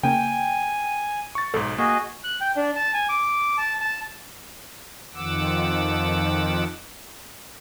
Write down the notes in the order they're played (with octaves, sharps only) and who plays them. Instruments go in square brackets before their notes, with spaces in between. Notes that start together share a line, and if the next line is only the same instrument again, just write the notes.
[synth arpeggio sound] C#3 A#3 [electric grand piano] G5 [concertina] G#5
[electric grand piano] C#6 A6
[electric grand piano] B1 G#2 [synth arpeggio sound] A4
[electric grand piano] A#3 [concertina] F#4 G#4 D#5
[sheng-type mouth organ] F#6
G5
D4
A5
G#5
D6
A5
A5
[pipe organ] F2 D#3 F3 F#5 D6 E6